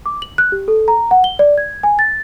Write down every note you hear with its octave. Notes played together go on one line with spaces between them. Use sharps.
D6
F#7
F#6
G4
A4
A#5
F#5
G7
D5
G#6
G#5
A6